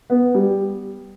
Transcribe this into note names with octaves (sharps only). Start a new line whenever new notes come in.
B3
G3